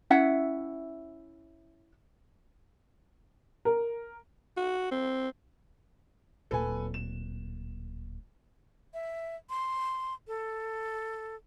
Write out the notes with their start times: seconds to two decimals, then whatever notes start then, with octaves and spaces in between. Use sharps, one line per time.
0.10 C#4 E4 E5 F#5
3.65 A#4
4.57 F#4
4.91 C4
6.51 D1 A#2 A4 B4 G#5
6.94 E7
8.94 E5
9.50 C6
10.27 A4